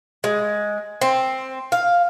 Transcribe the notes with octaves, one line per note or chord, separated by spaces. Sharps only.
G#3
C4
F5